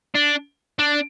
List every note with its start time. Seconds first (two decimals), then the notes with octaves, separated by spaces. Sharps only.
0.15 D4
0.79 D4